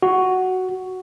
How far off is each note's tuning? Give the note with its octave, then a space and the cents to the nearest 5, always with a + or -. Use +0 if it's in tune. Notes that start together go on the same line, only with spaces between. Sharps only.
F#4 +5